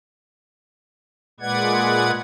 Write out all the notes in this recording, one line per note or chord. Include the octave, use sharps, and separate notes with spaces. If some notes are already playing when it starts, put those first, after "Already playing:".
A#2 G#3 B4 D5 F#5 G#6